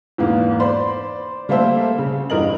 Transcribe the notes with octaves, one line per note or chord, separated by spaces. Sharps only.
E2 G#2 A#3 B3
C5 D5 B5 C6
G3 A3 A#3 A4 C5 E5
C#3
E2 G2 A#4 D#5 F#7